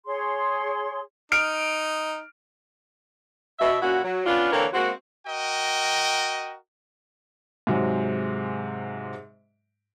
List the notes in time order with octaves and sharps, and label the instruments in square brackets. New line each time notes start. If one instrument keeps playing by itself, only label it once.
[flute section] G#4 C#5 C6
[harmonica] D#4 [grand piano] F6 D7
[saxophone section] B2 E5
A#2 C#4 E4 F#4
F#3
B3 C#4 D4 F4
D3 E3 A#3 C4 A#4 C#5
G#3 A#3 C4 F#4
[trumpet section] F#4 A#4 D#5 G5
[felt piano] G#2 C3 F#3 G#3